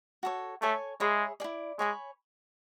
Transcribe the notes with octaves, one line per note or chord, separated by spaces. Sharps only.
F#4 A4 C#5
A3 A4 C#5 G#5 C#6
G#3 G#4 C#5 E5 B5
E4 G#4 D5
G#3 C#5 G#5 B5